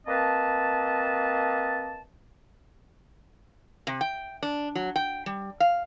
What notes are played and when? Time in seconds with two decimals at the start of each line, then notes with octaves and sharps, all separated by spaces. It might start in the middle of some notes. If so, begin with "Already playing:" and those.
0.07 A#3 C4 B4 D#5 A5
3.87 C3
4.01 G5
4.43 D4
4.75 F#3
4.96 G5
5.26 G3
5.60 F5